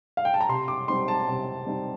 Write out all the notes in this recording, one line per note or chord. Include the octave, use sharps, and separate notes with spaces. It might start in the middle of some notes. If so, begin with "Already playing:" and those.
F5
G5
A5
A#5
C3 C6
D6
G3 C4 D#4 C6
A5
C3
G3 C4 D#4